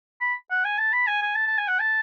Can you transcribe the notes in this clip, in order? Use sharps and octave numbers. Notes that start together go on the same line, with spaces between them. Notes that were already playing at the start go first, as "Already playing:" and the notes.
B5
F#5
G#5
A5
B5
G#5
G#5
A5
A5
G#5
F#5
A5